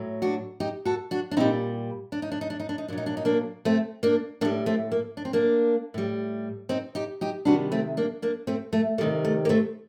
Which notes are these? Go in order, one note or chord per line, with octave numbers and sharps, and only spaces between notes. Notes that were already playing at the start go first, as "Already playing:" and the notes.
Already playing: A2 F#3
D4 F#4
D#4 G4
F#4 A4
D4 F#4
D4
A#2 G3 C4 D#4
D4
D#4
D4
D#4
D4
D#4
D4
D#4
A#2 F#3 D4
D#4
D4
D#4
A#3 D4
A3 C4
A#3 D4
A2 G3 A#3 D4
A3 C4
A#3
D4
C4
A#3 D4
A2 G3
C4 D#4
D#4 G4
D#4 G4
C3 D#3 G3 D4 F#4
A3 C4
A#3 D4
A#3 D4
A3 C4
A3
C3 D#3 G3 A3
A3
A#3
A3 C4